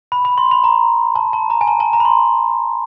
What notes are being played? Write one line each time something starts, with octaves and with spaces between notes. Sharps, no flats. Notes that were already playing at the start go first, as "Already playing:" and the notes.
B5
B5
C6
B5
A#5
A5
A5
A#5
G#5
A5
A5
A#5
B5
C6